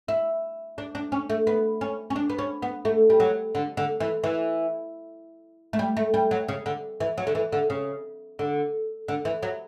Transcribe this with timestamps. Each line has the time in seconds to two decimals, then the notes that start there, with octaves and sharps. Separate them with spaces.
0.08 E4
0.78 D4
0.95 D4
1.12 C#4
1.30 A3
1.47 B3
1.81 C#4
2.10 C#4
2.16 D4
2.30 B3
2.39 C#4
2.62 B3
2.85 A3
3.10 G3
3.20 F#3
3.55 D3
3.77 D3
4.00 E3
4.24 E3
5.73 A3
5.79 G3
5.97 A3
6.14 G3
6.31 F#3
6.48 C#3
6.66 D3
7.00 E3
7.18 F#3
7.27 D3
7.35 E3
7.52 D3
7.70 C#3
8.39 D3
9.08 D3
9.25 E3
9.43 F#3